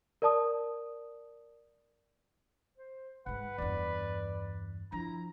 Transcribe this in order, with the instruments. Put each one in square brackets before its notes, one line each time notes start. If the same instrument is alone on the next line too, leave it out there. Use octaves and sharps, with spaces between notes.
[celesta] A#4 D5 A5 D#6
[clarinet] C5
[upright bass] G#2 G#3 [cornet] B4 [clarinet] F#5
[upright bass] E2 G2 [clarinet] D5
[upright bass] F3 D4 [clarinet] E4 [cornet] A#5